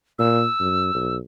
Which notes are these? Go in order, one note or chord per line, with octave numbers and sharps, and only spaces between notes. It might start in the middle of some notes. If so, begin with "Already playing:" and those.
A#2 E6
F#2
B1